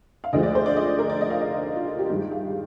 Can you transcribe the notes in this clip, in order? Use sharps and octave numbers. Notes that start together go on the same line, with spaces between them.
F5
D2 D3 F3 G#3 D#5
D5
C5
D5
D#5
A#4
D5
D#5
F5
D#5
F4
F4
G4
G2 D#3 G#3 G4
F5